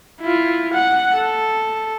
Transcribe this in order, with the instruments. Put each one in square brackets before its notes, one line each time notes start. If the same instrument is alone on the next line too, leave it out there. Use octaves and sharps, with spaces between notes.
[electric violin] E4 F4
F#5
A4